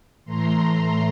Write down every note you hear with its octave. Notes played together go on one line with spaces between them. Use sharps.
A2 E3 A3 A#5 C6